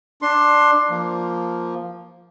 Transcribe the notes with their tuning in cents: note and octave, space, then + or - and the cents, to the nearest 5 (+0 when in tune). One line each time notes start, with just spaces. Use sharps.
D4 +10 C6 +15
F3 +0 A#3 +0